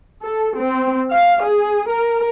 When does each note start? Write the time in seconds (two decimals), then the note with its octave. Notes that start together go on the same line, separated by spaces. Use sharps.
0.22 A4
0.57 C4
1.12 F5
1.43 G#4
1.90 A#4